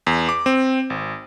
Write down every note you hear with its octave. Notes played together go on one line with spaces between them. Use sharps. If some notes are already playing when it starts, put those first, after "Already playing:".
E2
D6
C4
G#1